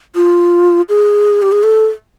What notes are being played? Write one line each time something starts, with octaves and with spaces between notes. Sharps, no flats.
F4
G#4
G4
G#4
A4